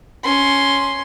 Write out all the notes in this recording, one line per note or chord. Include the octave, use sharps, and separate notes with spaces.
C#4 C6